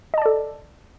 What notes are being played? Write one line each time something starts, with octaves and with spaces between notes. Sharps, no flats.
A4 D5 D#5 A5